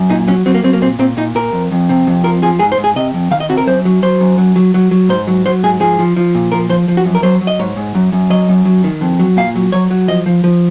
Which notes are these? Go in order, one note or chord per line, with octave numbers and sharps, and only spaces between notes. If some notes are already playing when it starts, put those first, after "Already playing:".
Already playing: F#2
A#2 D#4
F#3 C#4
F#3 C4
A#3
F#3 C4
A#3
A#2 C4
A#2 C4
A#2 D#4
A#2 A#4
F2
F2
C3
F2
F3 A#4
F3 G#4
G#2 G#4
C5
G#2
G#4
C3 D#5
F2
D#3 F5
D#5
C3 F#4
A#4
F#2 C5
F#3
F#3 C5
F#2
F#3
F#3
F#3
F#3
G#2 C5
F#3
F#3 C5
G#2 G#4
F3 G#4
F3
F3
A#2
F3 A#4
F3 C5
F3
F#4
F#2
A#4
F#3 C5
F#3
D#5
G#2 C#5
G#2
F#2
F#2
F#3 D#5
F#2
F#3
D#3
F2
F#3
A#2 F5
F#3
F#3 C#5
F#3
F3 D#5
F3
F3